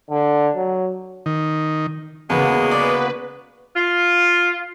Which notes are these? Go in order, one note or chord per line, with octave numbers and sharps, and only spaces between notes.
D3
F#3
D#3
E2 C#3 G#3 A#3 B3 F#4 B4
B4 D5
F4